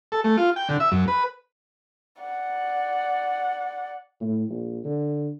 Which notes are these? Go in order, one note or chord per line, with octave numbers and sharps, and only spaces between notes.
A4
A3
F4
G5
D3
E5
F#2
B4
D5 F#5
A2
A#1
D3